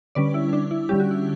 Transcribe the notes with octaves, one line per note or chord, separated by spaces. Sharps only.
D3 G3 C#4 B4 D5
E4
D4
E4
D3 G3 C#4 G4
F#4
E4